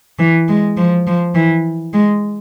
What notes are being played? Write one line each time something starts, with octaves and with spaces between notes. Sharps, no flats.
E3
G#3
F3
F3
E3
G#3